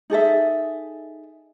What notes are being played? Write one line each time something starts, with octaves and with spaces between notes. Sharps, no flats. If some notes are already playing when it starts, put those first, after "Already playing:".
D#4 G#4 A4 E5